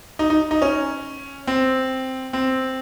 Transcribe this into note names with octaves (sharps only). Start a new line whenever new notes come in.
D#4
D#4
D#4
C#4
C4
C4